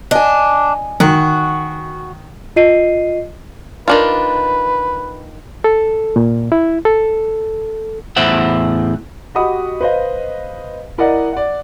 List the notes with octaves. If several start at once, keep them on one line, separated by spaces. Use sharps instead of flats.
D4 D#5 G#5
D#3 F#4
F4 D#5 C7 D#7
D#3 D4 F4 B4
A4
A#2
E4
A4
E2 A2 C5 E5 F#5
F#4 G4 D#5 F#5 B5 D#6
B4 C5 D#5 F5
E4 A#4 D5 D#5 F#5
D5 F#5